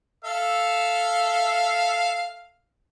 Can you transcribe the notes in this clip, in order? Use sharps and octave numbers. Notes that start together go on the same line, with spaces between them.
A4 E5 F5